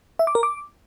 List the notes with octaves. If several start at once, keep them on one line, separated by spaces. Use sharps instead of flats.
E5
D6
A#4
D6